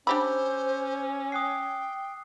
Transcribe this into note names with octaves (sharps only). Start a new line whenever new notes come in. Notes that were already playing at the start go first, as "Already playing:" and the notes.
C#4 D4 G4 C5 B5 D6 E6
G5 D#6 F#6 C7